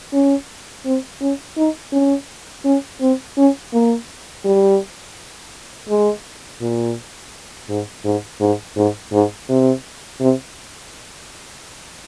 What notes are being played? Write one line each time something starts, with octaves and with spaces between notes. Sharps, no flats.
C#4
C4
C#4
D#4
C#4
C#4
C4
C#4
A#3
G3
G#3
A#2
G#2
G#2
G#2
G#2
G#2
C3
C3